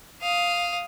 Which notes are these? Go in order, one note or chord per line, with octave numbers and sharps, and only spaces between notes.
F5 D#6